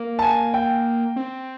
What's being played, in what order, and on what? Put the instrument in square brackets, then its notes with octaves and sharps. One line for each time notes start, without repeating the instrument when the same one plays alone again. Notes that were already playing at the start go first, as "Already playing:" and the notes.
Already playing: [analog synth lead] A#3
[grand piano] A5
G#5
G5
[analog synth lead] C4